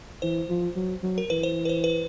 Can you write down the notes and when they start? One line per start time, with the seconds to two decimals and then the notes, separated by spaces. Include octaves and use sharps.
0.22 E3 C5
0.49 F3
0.76 F#3
1.02 F#3
1.18 A#4
1.30 E3 B4
1.43 C5
1.65 B4
1.69 C5
1.84 B4